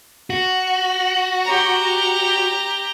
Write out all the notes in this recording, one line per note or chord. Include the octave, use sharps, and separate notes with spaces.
F#4
G4 A#5